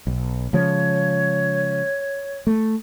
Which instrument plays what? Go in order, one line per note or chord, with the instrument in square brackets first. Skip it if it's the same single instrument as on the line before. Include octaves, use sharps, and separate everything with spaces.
[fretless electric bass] B1
[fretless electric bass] C#3 F3 G#3 [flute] C#5
[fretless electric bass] A3